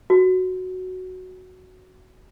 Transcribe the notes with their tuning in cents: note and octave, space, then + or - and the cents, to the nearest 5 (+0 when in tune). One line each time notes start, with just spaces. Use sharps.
F#4 +0